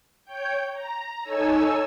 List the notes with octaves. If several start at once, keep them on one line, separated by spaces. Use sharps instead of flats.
C#5 G5 G6
A#5
D#4 A4 C#5 G#5 E6